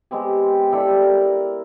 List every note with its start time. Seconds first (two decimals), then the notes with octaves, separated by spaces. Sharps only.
0.11 G#3 B3 C4 G4
0.72 E4 G4 A4 D5
1.02 A#4